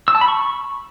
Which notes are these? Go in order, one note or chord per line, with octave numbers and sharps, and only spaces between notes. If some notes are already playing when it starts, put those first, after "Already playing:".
E6
A5
B5
C#6